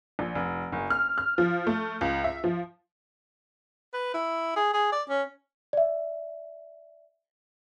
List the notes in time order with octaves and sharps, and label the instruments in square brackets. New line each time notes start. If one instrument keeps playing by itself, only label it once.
[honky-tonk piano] A#1
F1
F#1
F6
F6
F3
A3
C#2
E5
F3
[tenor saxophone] B4
E4
G#4
G#4
D5
C#4
[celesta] D5 E5